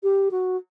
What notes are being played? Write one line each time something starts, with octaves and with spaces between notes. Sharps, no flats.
G4
F#4